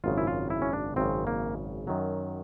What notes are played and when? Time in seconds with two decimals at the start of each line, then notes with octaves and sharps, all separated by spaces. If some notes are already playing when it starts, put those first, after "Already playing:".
0.04 G#1 F#2 C#3 F4
0.18 E4
0.27 F4
0.50 E4
0.62 C#4
0.73 D4
0.96 G#1 F#2 C#3 C4
1.27 A#3
1.87 F#2 D#3 F#3